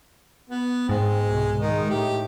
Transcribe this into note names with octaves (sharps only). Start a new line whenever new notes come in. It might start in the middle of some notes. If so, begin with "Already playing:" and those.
B3
G#2 G#3 C4
C2 B2
D#3 G#3 D#4
A2 G4